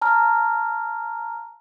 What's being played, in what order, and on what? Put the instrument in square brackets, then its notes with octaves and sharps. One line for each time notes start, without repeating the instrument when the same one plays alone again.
[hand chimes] A5 A#5 F6